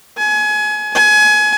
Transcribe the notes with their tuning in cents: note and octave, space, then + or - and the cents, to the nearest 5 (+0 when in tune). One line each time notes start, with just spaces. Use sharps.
G#5 +30
G#5 +25